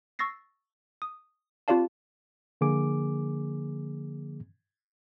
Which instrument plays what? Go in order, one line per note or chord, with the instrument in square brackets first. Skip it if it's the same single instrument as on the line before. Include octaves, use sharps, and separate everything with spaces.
[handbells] C#6 E6 A6 A#6 C7
D#6
C4 F4 G4 D5 F5 A5
[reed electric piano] D3 F3 A#3 G#4 D6